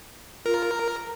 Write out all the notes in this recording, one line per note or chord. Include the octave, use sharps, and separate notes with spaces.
F4 A#4
A#5